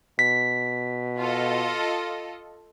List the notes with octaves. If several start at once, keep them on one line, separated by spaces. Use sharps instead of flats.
B2 B6
F4 A4 D#5